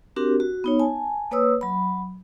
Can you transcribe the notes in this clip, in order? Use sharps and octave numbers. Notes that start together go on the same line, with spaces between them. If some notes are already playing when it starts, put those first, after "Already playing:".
C4 D4 F#4 G4 A#4
F#4
B3 D#4 C#5
G#5 A5
A#3 B4 C#5 D#6 E6
F#3 B5